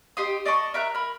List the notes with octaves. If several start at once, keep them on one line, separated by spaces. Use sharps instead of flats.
D#4 G4 C6 D#6
D5 D#5 A5 C#6
A#4 E5 A#5 F#6
A#4 B5